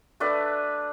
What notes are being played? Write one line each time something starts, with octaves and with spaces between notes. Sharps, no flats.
A3 D4 B4